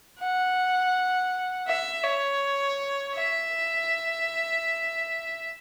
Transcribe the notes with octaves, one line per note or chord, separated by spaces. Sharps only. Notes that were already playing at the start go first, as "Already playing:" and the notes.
F#5
E5
C#5
E5